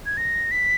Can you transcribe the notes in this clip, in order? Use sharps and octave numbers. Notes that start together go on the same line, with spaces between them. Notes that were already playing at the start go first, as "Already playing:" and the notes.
G#6
A#6
B6